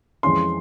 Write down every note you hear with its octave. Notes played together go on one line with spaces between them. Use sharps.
F2 E3 G#3 C#4 C6